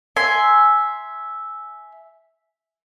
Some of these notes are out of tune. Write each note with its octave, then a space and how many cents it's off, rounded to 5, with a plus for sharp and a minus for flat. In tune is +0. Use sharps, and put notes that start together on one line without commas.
E5 -5 G#5 +10 C6 +0